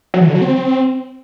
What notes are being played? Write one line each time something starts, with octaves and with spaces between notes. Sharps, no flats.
F#3
E3
D3
F#3
C4